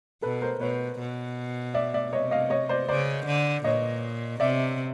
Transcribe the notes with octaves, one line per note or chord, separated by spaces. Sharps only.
B2 A4 B4
A#4 C5
B2 B4 C#5
B2
D5 E5
D5 E5
C3 C#5 D#5
D#5 F5
C#5 D#5
C5 D5
C#3 C5 D5
D3
A#2 C#5 D#5
C3 D5 E5